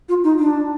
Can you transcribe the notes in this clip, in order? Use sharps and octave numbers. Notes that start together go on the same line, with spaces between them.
F4
D#4
D4